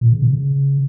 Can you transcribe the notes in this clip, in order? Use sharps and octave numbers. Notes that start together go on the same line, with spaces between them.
A#2
C#3
B2
C#3